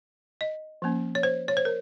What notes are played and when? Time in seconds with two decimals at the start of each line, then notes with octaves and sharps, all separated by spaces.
0.41 D#5
0.82 F3 A#3 C#4
1.15 C#5
1.23 C5
1.48 C#5
1.57 C5
1.65 A#4